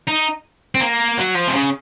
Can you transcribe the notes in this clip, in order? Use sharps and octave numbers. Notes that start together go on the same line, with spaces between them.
D#4
C4
A#3
F#3
F3
C3
C#3